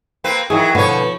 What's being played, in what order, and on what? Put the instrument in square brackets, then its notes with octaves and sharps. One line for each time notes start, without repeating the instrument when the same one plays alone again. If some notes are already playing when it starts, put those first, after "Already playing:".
[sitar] A#3 C4 B4
[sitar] D#3 E3 F#3 [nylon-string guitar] G#4
[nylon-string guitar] B2 D3 B3 [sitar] F3 C#5